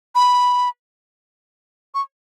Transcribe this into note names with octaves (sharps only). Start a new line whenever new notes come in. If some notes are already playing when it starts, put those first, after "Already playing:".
B5
C#6